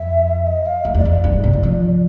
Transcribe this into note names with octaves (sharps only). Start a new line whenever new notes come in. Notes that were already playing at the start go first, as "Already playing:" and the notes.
Already playing: F2 E5
D#5
F5
F2 D#5
E2 D5
F2
D5
G2
G#2
C3
E3
F3